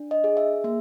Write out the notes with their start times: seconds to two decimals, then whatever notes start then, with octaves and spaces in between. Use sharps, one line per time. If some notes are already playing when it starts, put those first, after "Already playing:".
Already playing: D4
0.11 D#5
0.24 G#4
0.37 E5
0.64 A#3 E5